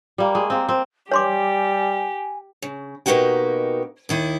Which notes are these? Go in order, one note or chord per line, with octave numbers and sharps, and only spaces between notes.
G3 A#3
G#3
A#3 C4
C4
G3 G4 C#5 G#5 C6 D6
C#3
B2 E3 A#3 D#4 F#4 G4
D#2 D#3 E4